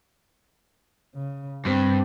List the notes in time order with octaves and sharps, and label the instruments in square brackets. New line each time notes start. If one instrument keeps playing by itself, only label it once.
[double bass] C#3
[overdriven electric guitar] G2 [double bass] C4